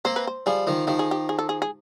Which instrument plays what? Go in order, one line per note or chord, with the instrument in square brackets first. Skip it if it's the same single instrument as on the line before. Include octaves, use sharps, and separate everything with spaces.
[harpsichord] A#3 C4 [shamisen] C5
[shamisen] B4
C5
[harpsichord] F3 G3 [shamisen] G#4
[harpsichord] D#3 F3
[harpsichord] D#3 F3 [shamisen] G4
[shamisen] G#4
G4
G#4
A4
G#4
G#4